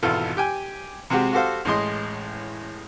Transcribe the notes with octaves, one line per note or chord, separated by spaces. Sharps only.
G#1 E2 B2 F4 A4
G4 G5 G#5
C3 G#3 C4 F#4 G4
F#4 G4 A4 C5 F5
A1 A2 G#3 D#5 C6